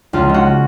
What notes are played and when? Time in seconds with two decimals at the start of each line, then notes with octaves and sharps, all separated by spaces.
0.13 C#2 F4
0.29 G#3 F#4